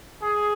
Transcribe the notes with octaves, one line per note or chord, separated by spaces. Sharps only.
G#4